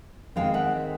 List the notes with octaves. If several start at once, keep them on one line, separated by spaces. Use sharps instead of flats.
D#3 G#3 C4 F5 G5
E5 F#5